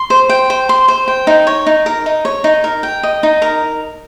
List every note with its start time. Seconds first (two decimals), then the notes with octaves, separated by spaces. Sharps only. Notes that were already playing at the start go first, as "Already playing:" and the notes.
Already playing: C6
0.10 C5
0.29 G5
0.50 C5
0.69 C6
0.88 C5
1.08 G5
1.27 D#4
1.47 C#5
1.66 D#4
1.86 A#4
2.06 D#4
2.25 C#5
2.44 D#4
2.64 A#4
2.83 G5
3.03 D#5
3.23 D#4
3.42 A#4